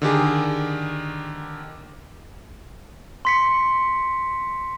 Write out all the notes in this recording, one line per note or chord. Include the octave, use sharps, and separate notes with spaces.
D3 D#3 G4 G#4
C6 B6 C#7